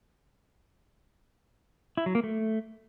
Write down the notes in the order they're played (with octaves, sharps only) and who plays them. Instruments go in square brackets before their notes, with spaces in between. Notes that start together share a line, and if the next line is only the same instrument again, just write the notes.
[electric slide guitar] E4
F#3
A#3
A3